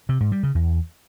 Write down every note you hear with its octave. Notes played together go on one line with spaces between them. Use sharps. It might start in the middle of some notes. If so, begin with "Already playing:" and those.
C3
G#2
G3
C#3
E2